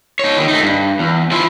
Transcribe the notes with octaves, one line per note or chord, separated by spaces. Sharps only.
D#4 C#5
D#2 D#3
A3 D#4
G2
E2
F3 E4